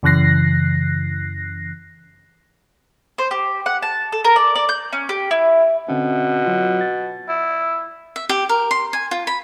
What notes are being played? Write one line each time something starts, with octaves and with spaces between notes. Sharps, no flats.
F#2 C#3 E3 F#6 A#6 C7
C5
G4
F#5
A5
A4
A#4
D5
D5
G6
C#4
G4
E4
B2 D3 C4 C#4
F#3 F4
A6
E4
E5
G4
A#4
C6
G#5
F4
B5